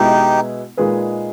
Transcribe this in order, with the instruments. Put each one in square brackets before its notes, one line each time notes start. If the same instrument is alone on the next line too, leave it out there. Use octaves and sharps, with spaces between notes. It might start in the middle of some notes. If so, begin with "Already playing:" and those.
Already playing: [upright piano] B2 G#3 B3 E4 [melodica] D#4 G4
[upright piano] A#2 G#3 D#4 G#4 B4